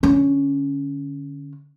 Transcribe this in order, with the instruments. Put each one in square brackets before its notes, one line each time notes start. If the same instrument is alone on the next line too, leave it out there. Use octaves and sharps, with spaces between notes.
[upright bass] D3 C#4